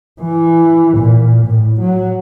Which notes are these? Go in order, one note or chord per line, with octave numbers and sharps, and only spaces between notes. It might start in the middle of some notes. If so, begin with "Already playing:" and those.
E3
A#2
A2
F#3